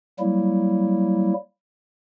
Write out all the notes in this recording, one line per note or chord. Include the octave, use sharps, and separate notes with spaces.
F#3 G3 A#3 E4